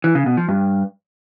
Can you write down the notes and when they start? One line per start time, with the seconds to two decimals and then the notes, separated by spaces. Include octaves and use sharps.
0.04 E3
0.15 C#3
0.26 B2
0.37 F3
0.49 G2